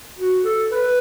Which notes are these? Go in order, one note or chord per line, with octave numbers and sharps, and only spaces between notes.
F#4
A4
B4